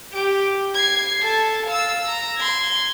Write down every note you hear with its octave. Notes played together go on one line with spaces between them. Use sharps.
G4
G#6 C7
A4 A5
F5 E6
A#5
C6 G#6